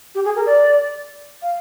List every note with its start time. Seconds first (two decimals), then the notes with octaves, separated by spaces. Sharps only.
0.15 G4
0.25 G#4
0.36 A#4
0.46 D5
1.42 F5